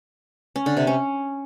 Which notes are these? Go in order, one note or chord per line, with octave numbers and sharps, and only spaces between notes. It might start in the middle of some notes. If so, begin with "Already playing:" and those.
C#4
D3
C3
C#4